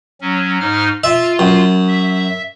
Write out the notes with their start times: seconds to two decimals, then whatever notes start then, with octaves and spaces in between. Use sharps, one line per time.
0.21 F#3 C#4
0.60 G#2 D#4 F6
1.04 F4 E5
1.39 F#2
1.88 E5